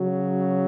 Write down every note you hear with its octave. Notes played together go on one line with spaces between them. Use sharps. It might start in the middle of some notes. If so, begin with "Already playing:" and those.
Already playing: C#3 F#3